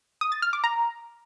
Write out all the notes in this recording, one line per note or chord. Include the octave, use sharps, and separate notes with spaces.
D#6
A6
F6
D6
A#5